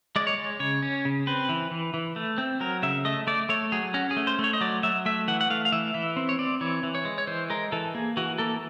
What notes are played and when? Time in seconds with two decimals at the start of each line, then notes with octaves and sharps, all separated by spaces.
0.16 G#3 D5
0.27 C#5
0.38 G#3
0.60 C#3 C#5
0.82 C#4
1.05 C#3
1.27 C4 B4
1.49 E3
1.71 E3
1.94 E3
2.16 A3
2.38 C4
2.60 F#3 A#4
2.83 C#3 E5
3.05 A3 D#5
3.27 A3 D5
3.49 A3 C#5
3.72 F#3 G#4
3.94 C#4 F#4
4.11 G#4
4.17 A3
4.27 C5
4.39 A3
4.44 C#5
4.53 D#5
4.61 F#3 D5
4.83 F#3 E5
5.06 A3 E5
5.28 E3 F#5
5.41 F#5
5.50 A3 F5
5.65 F5
5.72 E3 E5
5.94 E3 E5
6.16 C4
6.29 C#5
6.39 C4 D5
6.61 E3 C#5
6.83 E3
6.95 C#5
7.05 G#3
7.18 C#5
7.27 E3 C5
7.50 G#3 A#4
7.72 E3 A4
7.94 A#3 G#4
8.17 E3 F#4
8.38 A#3 A4